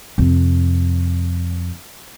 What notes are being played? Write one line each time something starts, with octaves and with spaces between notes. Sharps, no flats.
F2 C3